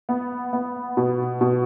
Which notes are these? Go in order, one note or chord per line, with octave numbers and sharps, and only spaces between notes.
B3
B3
B2
B2